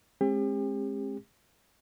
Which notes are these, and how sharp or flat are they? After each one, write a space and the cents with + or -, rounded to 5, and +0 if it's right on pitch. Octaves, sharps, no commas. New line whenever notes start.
G#3 +25 C4 +40 G4 +40